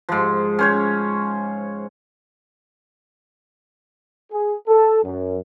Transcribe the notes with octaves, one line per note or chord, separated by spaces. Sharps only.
G#2 F3
C#4 C5 C#5
G#4
A4
F#2